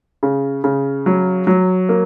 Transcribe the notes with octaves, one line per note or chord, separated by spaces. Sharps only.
C#3
C#3
F#3
F#3
A#3